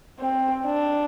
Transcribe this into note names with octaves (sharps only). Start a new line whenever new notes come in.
C4
D4